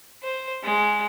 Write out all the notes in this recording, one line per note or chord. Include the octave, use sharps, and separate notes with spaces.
C5
G#3